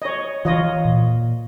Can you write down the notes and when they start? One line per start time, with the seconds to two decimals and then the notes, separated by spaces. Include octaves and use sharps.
0.02 C#5 D#5
0.45 E3 F4 C#5 D#5
0.85 A#2